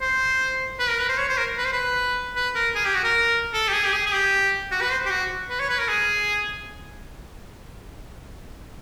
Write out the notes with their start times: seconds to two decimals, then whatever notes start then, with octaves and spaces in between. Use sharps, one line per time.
0.01 C5
0.80 B4
0.89 A#4
1.00 B4
1.09 C5
1.18 C#5
1.29 C5
1.38 A#4
1.57 B4
1.65 C5
1.73 B4
2.36 B4
2.55 A#4
2.75 G#4
2.85 G4
2.95 F#4
3.04 A#4
3.54 A4
3.68 G4
3.73 G#4
3.85 G4
3.92 G#4
4.06 G#4
4.12 G4
4.72 F#4
4.81 B4
4.91 C5
5.06 G4
5.10 F#4
5.50 B4
5.60 C#5
5.70 B4
5.79 A#4
5.88 G#4